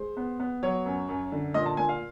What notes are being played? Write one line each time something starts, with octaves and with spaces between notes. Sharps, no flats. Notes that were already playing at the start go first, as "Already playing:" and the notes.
Already playing: G#3 C5
B3
B3
F#3 C#5
F#2
F#2
D3
A#2 D#5
A5
A#2 G#5
F5